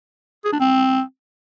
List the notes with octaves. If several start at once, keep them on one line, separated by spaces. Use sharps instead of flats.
G#4
D4
C4